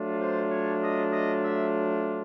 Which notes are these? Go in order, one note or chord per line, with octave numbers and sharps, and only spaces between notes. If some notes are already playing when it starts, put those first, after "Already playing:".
Already playing: F#3 A3 D4 F4
C5
C#5
D#5
D#5
E5